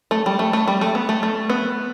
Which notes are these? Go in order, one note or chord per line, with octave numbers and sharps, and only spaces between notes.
A3
G3
A3
A3
G3
A3
B3
A3
A3
B3